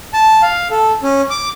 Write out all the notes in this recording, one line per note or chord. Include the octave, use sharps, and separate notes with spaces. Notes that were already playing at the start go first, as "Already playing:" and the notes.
A5
F5
A4
C#4
D6